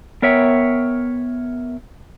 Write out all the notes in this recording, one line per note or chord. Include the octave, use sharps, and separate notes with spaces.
B3 A#4 C#5 E5 G5